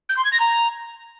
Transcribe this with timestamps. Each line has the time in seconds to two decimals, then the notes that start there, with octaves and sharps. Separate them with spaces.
0.09 G6
0.16 C6
0.24 G#6
0.32 A#6
0.39 A#5